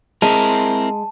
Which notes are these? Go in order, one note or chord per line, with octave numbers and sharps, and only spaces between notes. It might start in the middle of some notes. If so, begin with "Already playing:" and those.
G#3 C4 E4 A#4 A5